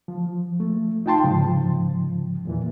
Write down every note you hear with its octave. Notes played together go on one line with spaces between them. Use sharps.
F3
A3
D#4 F4 G5 A5 C6
G#2 C#3 F3
E2 A#2 E3